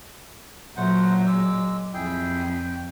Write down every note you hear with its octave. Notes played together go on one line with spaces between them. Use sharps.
A#2 F#3 A3 C5 F#5
G#3 D6 E6
F2 E4 G#4 G5
G5